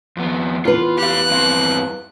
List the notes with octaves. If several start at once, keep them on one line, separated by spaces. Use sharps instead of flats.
F2 B3
E2 F4 B4
G4 F5 F#6
G2 C4 F5